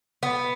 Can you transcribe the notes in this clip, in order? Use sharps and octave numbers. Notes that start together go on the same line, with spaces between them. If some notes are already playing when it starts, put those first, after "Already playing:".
B3